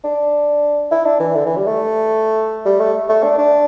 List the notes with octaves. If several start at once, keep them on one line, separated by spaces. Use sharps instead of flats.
D4
E4
D4
E3
D3
E3
G3
A3
G3
A3
A3
D4
D4